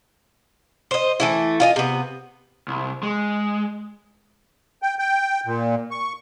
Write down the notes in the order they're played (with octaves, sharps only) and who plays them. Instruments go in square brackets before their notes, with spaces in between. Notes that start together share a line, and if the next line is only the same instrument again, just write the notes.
[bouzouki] C5 D#5
E3 A3 E4
F4 D#5 G#5
C3 B3
[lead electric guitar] C2
G#3
[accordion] G5
G5
A#2
C#6